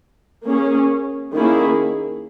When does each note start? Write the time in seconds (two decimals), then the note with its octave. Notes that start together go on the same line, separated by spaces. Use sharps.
0.45 A#3 C#4 G#4
1.34 D#3 A#3 C#4 E4 G#4